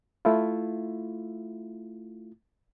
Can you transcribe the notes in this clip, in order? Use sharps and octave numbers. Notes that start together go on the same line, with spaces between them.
A3 E4 F4